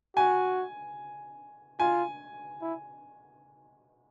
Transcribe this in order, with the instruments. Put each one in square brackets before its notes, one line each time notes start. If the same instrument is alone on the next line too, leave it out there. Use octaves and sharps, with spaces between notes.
[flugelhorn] F#4 [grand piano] G#5
[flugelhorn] F4 [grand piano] G#5
[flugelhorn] E4